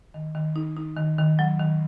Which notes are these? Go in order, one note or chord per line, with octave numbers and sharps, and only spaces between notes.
D#3
D#3
D#4
D#4
D#3
D#3
F#3
D#3